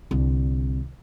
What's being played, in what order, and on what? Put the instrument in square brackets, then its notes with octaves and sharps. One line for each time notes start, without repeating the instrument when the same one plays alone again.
[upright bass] C2 D3